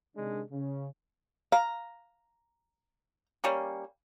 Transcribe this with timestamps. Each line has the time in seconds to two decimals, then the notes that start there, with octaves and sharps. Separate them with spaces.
0.16 C3 D#3 G#3 D4
0.51 C#3
1.52 F5 A#5
3.44 G3 A#3 C#4